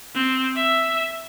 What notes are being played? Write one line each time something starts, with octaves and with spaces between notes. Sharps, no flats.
C4
E5